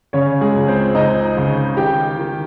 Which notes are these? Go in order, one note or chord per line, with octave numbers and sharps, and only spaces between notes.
C#3 C#4 C#5
G#3 G#4
C#2
C4 C5
C#2 D#4 D#5
C#3
D#3 G4 G5
D#3